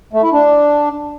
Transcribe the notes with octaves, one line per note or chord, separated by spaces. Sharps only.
A3
E4
D4